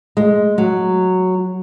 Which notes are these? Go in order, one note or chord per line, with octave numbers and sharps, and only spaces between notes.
G#3
F#3